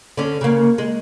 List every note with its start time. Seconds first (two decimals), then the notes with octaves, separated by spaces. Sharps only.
0.17 D3 C#4
0.41 C#3 A#3
0.78 G#3